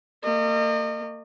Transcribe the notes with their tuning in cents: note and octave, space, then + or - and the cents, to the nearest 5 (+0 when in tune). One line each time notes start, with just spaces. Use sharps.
A#3 -40 D#5 -35